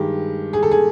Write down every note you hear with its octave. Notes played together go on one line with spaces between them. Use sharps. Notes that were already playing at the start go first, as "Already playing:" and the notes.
Already playing: G2 D#3 G#3 G4
G#4
A4
G#4